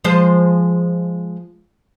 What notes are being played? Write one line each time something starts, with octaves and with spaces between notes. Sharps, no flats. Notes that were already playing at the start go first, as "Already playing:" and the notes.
F3 G#3 C5